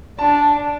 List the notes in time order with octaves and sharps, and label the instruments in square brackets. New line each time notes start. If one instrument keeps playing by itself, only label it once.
[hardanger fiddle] D4 [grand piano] A5